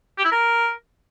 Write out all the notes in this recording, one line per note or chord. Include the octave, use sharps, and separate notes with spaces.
G4
E4
A#4